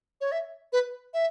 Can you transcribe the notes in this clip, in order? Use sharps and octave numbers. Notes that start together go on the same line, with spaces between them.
C#5
E5
B4
E5